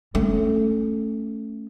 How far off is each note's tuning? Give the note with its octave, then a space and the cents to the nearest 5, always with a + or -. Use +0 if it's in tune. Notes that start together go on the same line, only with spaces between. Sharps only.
A3 +0 C#4 +0